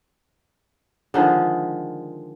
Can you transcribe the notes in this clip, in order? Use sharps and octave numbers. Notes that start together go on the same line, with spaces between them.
D3 D#3 F3 G#3